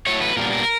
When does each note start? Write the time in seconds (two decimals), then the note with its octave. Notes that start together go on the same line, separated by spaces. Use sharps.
0.06 A2 F#3 A3 C#5
0.22 B4
0.37 A#2 G3 B3 D4 A#4
0.52 A#4